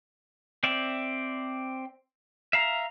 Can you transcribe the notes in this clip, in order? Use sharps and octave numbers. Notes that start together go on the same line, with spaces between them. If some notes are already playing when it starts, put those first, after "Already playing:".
C4 D5 E5
E5 F5 A#5